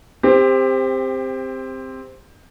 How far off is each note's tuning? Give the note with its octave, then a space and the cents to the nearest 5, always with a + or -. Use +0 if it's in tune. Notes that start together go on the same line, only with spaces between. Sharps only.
C4 +0 G4 +25